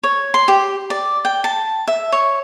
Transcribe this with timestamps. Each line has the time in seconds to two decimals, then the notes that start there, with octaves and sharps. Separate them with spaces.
0.03 C#5
0.34 C6
0.48 G4
0.90 D5
1.25 G5
1.44 A5
1.88 E5
2.12 C#5